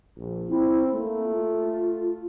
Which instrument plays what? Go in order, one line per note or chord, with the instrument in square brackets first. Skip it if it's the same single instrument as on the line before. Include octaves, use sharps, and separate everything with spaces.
[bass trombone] A#1
[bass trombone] C4 [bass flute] E4
[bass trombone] A3 [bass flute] A#3
[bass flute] F4